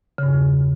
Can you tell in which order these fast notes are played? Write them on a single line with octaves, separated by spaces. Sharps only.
C#3 G2 E2